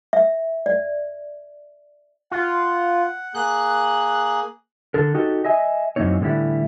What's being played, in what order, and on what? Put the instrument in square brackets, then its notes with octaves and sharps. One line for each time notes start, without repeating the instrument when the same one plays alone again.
[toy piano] E5
D5
[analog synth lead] F4 [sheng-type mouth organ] F#5
[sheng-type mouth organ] A#3 G#4 [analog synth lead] F#6
[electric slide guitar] D3 A4 A#4
D#4 F#4 G4 A4
D#5 E5 G#5
F#2 E3 A#3 C4 D#4 C#5
A2 D3 E3 G3 E4